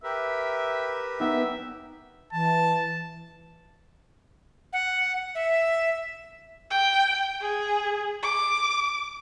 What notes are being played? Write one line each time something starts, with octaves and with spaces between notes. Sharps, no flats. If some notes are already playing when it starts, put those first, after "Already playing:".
G4 A#4 B4 E5
B3 D#4 E5
E3 A5
F#5
E5
G5
G#4
D6